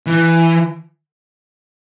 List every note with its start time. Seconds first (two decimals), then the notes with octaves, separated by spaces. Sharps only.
0.06 E3